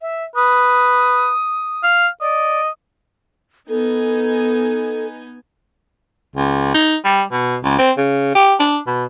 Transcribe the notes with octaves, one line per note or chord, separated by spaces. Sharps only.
E5
B4 D#6
F5
D5 D#5
B3 D#4 A4 G#5
C#2
D#4
G3
B2
C#2
C4
C#3
G4
D4
B2